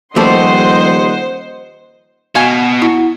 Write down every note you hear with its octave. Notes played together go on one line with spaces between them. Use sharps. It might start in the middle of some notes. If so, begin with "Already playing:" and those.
D#1 F3 G3 A3 C5 D#5 F#5 C6
B2 F#4 F5 G#5
E4 F#4